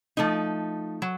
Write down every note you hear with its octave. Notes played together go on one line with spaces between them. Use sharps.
F3 A3 D#4
F#3